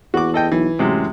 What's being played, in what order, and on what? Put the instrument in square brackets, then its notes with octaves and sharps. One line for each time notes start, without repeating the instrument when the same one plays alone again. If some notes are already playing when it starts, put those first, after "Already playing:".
[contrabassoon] E2 [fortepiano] F#4 D6
[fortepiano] A4 D#5 G5
[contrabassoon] B1 [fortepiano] E3
[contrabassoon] A1 [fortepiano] C3 F#3 G#3